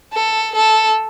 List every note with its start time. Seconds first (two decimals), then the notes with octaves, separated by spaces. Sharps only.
0.13 A4
0.55 A4